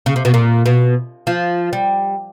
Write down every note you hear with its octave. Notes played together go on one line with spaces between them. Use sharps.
C#3
C3
B2
A#2
B2
F3
G3